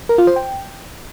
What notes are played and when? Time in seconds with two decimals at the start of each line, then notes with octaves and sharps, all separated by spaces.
0.09 A#4
0.18 F4
0.27 C5
0.36 G5